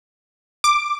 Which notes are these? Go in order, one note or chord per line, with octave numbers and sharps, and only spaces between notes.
D6